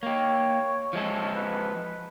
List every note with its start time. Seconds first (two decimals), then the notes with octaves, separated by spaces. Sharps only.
0.03 A#3 G4 C#5
0.93 F3 G#3 A4
1.36 B4